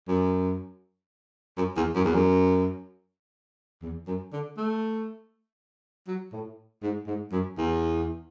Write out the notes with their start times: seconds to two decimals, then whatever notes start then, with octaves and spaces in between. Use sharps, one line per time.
0.08 F#2
1.57 F#2
1.77 E2
1.95 F#2
2.05 E2
2.14 F#2
3.82 E2
4.07 F#2
4.33 D3
4.57 A3
6.08 F#3
6.33 A2
6.82 G#2
7.07 G#2
7.32 F#2
7.58 E2